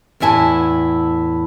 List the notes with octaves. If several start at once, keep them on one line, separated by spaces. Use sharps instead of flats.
E2 A2 E4 G#5 A5